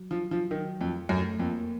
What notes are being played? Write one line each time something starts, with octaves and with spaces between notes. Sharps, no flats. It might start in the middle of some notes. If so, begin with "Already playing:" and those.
Already playing: F#3
F3
F3
D#3
F2
F#2 A3
F2 A#3